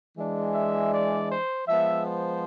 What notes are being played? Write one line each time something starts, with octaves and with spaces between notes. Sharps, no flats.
E3 G#3 D4
E5
D5
C5
F3 G#3 B3 E5
C5